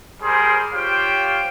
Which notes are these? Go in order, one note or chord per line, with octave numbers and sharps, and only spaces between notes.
G3 G#4 A#4 C5
F4 G4 C5 C#5 F5 G5